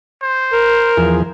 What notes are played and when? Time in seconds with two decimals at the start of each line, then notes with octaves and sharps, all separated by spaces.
0.22 C5
0.53 A#4
0.97 E2 F3 G#4